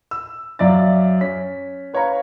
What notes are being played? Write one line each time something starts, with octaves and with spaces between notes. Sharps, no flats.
E6
F#2 D5 E5 F5 A6
C#4 B6
B4 C#5 F5 A#5 C#6